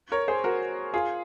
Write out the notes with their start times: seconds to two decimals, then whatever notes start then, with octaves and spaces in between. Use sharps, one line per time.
0.12 A#4 C#5
0.28 G#4 C5
0.44 F#4 A#4
0.94 F4 G#4